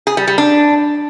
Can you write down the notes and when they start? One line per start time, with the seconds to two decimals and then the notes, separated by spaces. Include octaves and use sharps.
0.07 G#4
0.17 G3
0.27 G3
0.38 D4